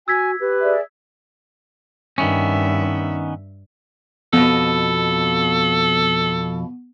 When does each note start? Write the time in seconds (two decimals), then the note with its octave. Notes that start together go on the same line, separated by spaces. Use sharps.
0.08 F#4 G#5 E6 G#6 B6
0.40 G4 B4
0.61 G#4 D5 E5
2.18 G2 D#3 B3 C#4 E5
4.33 F2 B2 B3 A4